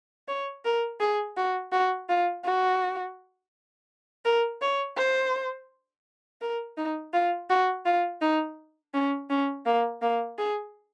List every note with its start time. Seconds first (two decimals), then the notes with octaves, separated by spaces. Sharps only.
0.28 C#5
0.65 A#4
1.00 G#4
1.37 F#4
1.72 F#4
2.09 F4
2.45 F#4
4.25 A#4
4.61 C#5
4.97 C5
6.41 A#4
6.77 D#4
7.13 F4
7.49 F#4
7.85 F4
8.21 D#4
8.94 C#4
9.30 C#4
9.66 A#3
10.02 A#3
10.38 G#4